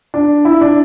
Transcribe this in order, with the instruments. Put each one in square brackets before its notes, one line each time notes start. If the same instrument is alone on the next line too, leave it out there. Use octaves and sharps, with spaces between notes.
[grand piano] D4
E4
D4